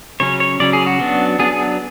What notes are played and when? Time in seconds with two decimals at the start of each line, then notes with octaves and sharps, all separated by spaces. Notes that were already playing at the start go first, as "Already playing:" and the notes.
0.20 C#3 F#3 C#4 C#5
0.40 C#5
0.60 C#3 F#3 C#4 D5
0.73 G#4
0.87 F#4
1.00 F#3 B3 D4
1.39 F#3 B3 D4 G#4
1.52 G#4